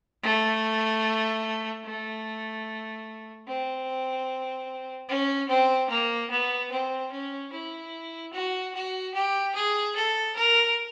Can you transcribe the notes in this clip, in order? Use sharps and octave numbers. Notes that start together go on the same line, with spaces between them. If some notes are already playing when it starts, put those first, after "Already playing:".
A3
A3
C4
C#4
C4
A#3
B3
C4
C#4
E4
F#4
F#4
G4
G#4
A4
A#4